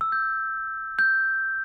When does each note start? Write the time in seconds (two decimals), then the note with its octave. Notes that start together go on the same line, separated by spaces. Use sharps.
0.01 E6
0.12 G6
0.99 G6